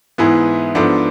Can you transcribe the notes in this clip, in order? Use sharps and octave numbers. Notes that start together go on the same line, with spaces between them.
G#2 E3 B3 E4 G#4
G#2 F3 B3 D4 A4